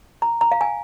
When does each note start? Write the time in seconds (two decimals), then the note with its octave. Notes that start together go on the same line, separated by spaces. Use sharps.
0.22 A#5
0.41 A#5
0.52 F5
0.61 G#5